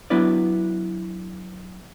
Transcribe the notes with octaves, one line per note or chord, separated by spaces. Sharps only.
F#3 B3 D4 E4 B4 D5